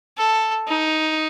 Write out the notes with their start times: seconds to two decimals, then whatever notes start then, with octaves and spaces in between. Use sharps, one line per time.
0.18 A4
0.67 D#4